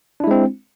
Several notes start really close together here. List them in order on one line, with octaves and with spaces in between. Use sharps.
D4 E4 G#3 C4